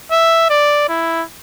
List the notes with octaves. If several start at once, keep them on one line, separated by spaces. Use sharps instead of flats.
E5
D5
E4